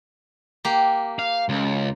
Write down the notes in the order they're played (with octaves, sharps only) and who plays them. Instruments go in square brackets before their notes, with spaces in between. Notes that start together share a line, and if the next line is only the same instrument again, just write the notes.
[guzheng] A#3 G4
[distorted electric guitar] F5
C#2